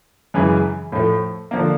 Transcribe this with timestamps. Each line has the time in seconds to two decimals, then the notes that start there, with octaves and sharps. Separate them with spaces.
0.34 F#2 C#3 E3 G#3
0.92 A2 F3 A3
1.51 D3 F3 A#3